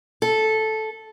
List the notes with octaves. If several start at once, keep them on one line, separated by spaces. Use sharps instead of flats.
A4